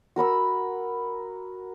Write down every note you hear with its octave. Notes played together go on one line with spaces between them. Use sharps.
F#4 A#4 B5 E6